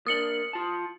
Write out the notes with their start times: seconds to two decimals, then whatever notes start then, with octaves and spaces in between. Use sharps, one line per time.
0.07 A#3 D4 D#6 C#7 F#7
0.53 F4 A5